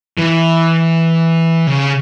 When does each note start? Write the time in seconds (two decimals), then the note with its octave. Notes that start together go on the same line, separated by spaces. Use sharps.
0.17 E3
1.67 C#3